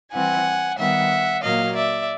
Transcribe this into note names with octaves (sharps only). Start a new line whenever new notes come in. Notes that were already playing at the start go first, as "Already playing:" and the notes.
E3 G3 C4 F#5 G#5
D#3 G3 B3 E5 F#5
A#2 F#3 A#3 D#5 F5
D5 E5